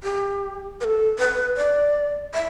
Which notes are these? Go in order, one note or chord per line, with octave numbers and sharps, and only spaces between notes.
G4
B4
A4
B4
D5
E5